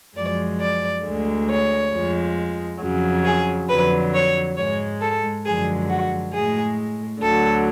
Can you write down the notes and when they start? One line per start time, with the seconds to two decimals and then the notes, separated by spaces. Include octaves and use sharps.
0.16 F#2 F3 G#3 D5
0.61 D5
1.05 D2 D3 G#3
1.48 C#5
1.93 F2 F3 G#3
2.81 F2 C#3 F#3
3.25 G#4
3.69 F2 D3 F#3 B4
4.14 C#5
4.57 G#2 G#3 C#5
5.02 A4
5.45 F#2 D3 F3 G#3 G#4
5.89 F#4
6.33 A2 G#3 G#4
7.22 D2 D3 F#3 A4